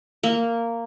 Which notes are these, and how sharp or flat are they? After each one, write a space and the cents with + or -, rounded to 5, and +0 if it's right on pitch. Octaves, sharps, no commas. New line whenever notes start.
A#3 -10